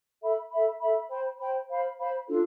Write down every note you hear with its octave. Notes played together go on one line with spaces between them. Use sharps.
A4 E5 B5
A4 E5 B5
A4 E5 B5
C5 G5 B5
C5 G5 B5
C5 F5 B5
C5 F5 B5
D4 F4 A4